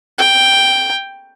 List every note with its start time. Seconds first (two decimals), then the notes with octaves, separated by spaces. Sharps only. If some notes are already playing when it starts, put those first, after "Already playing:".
0.18 G5